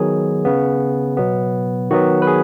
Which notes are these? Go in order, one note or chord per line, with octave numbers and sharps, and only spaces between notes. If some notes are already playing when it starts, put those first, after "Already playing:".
Already playing: D#3 F#3 B3 G#4
C#3 B3
B2 F#3 B3
D#3 F#3 B3 F#4
B4
G#4